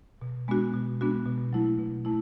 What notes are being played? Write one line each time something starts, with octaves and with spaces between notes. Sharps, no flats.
B2
G#3 B3 D4 F#4
B2
G#3 B3 D4 F#4
B2
F#3 A3 E4
B2
A3 E4